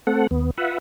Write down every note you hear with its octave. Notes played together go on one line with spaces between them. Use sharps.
A3 C4 A4 F#5
D#2 B3
F4 B4 E5 F#5